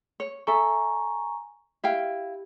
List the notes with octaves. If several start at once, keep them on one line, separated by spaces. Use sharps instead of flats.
C#5
A4 E5 G#5 A#5 C#6
E4 G4 F5 G5